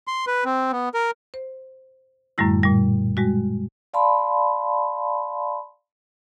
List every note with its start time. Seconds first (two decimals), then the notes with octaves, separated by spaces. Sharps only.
0.07 C6
0.27 B4
0.45 C4
0.72 B3
0.94 A#4
1.34 C5
2.38 F#2 A2 D3 G3 A3 E4
2.63 A#2 G3
3.17 G3 G#3 F#4
3.94 D5 F5 A5 B5 C6